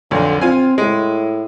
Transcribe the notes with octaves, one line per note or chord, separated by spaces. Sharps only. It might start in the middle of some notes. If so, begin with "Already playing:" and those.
B1 F2 D3
C4 F4 G#5
A2 G#3